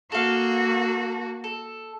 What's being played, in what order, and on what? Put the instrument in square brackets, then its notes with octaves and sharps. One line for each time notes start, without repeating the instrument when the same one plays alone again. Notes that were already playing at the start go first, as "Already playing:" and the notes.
[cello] A#3 F#4 [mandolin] A4 F5
[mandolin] A4